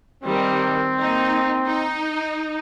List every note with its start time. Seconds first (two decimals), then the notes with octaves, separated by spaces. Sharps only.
0.24 D#3 G3 C4
1.00 A#3 D#4
1.68 D#4